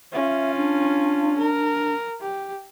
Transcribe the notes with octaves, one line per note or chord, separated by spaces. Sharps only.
C#4 F4 E5
D4
A#4
G4